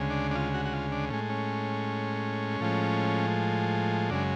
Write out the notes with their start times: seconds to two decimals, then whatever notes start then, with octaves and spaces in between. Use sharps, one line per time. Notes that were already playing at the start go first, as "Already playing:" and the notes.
Already playing: D2 C#3 G#3
0.10 D4
0.31 D4
0.35 F4
0.54 F#4
0.65 F#4
0.73 F4
0.92 D4
1.10 A2 G#3 C#4
1.30 C#4
2.60 A2 F3 G#3
4.10 F#2 C#3 G#3 D4